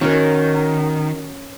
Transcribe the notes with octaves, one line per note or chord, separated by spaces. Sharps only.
D#3 C#4 F#4 A#4